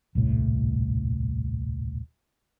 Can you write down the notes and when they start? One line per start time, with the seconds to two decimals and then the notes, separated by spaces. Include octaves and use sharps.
0.15 D#1 C2 A2